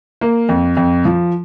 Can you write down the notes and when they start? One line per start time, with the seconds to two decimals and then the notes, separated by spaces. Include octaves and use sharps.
0.21 A#3
0.49 F2
0.77 F2
1.05 F3